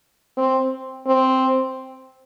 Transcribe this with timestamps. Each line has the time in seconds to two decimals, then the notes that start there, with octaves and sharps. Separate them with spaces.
0.37 C4
1.06 C4